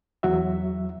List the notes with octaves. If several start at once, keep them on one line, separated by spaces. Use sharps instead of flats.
E2 F#3 F#4 E5